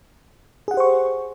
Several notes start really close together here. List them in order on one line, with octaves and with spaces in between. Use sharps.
G#4 F#5 G4 C5 C#6